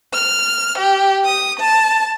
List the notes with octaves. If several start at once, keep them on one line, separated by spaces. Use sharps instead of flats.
F6
G4
D#6
A5